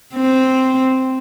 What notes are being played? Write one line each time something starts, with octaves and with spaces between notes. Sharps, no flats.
C4